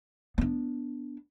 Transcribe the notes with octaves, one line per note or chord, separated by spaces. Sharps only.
B3 D4